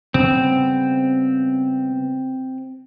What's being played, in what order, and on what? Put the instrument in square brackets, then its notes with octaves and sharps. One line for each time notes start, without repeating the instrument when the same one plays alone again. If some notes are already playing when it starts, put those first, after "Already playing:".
[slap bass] C#3 G3 B3 [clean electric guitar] C4